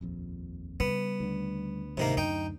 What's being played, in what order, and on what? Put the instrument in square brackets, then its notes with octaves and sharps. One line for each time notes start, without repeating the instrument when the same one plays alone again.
[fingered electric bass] D#1 A#1 F2
[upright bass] C#3 G3 [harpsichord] B3
[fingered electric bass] D2 D3
[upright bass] G#2 [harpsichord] C3 D#3 A#3
[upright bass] F#2 [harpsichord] D#4 G5